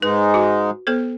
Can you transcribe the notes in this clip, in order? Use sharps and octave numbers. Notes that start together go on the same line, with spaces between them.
G#2 G#3 D#4 B4
F#4
B3 A4 C5